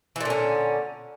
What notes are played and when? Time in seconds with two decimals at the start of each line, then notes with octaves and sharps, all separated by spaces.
0.16 E3
0.21 A#2
0.25 D3
0.30 C#4